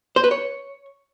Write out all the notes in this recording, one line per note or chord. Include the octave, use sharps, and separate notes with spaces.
C5
B4
C#5